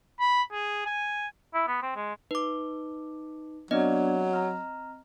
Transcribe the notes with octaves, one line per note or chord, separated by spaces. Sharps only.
B5
G#4
G#5
E4
B3
C4
G#3
D#4 B4 D6
F#3 B3 C4 D4 D5 D#5
A#5 F6